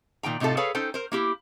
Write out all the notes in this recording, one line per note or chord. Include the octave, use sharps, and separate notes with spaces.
A#2 D#3 G5 A#5
A2 C3 D#4 F4 A4
G#4 A4 B4 C#5 F5
C#4 D#4 A4 C5 G5
A#4 C5
A#3 E4 G4